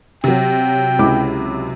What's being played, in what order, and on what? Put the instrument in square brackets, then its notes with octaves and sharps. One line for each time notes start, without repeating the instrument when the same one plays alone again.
[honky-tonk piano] C3 F#3 [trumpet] G5
[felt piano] C#2 E4 D6